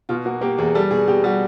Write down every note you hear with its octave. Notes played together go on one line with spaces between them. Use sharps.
B2 F4
A#3 F#4
A#3 G4
E2 G#4
G3 A4
B2 G#4
B2 G4
G3 F#4